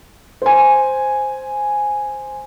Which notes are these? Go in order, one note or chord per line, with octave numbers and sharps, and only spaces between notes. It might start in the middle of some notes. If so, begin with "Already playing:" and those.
C5 G#5